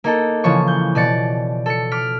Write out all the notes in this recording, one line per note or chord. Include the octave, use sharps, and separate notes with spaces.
A#3 D#4 A4
C#3 E3 F3 C#5 C#6
G6
B2 D5 D6 A6 C#7
A4 C#7
D6 F6 B6